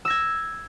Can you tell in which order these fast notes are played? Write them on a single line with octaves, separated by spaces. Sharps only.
E6 A#6 G#6